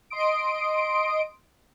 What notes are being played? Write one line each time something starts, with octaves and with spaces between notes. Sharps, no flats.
D#5 C6 D#6 D7